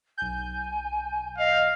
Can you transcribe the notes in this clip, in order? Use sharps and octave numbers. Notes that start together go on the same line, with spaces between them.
B1 G#5 G6
D#5 F5